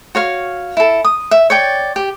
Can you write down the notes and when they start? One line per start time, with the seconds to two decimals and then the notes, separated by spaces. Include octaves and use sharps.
0.15 F#4 C#5 F5
0.77 E4 A4
1.04 D#6
1.31 E5
1.50 C#5 D5 G5
1.96 G4